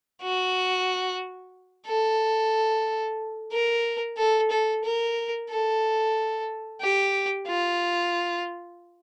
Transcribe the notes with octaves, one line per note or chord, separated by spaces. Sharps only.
F#4
A4
A#4
A4
A4
A#4
A4
G4
F4